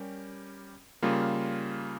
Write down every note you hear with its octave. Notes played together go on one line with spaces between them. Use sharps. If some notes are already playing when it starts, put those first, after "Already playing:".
Already playing: G3 C#4 G4 A#4
C#3 G3 A#3 F4